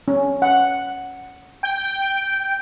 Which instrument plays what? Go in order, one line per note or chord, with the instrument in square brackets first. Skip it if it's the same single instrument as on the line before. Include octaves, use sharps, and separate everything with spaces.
[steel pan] C#4
F#5
[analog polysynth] G5